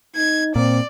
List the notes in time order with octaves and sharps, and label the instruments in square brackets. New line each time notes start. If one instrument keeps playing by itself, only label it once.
[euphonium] D#4 [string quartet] G#6
[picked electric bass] A#2 [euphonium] C4 [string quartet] D5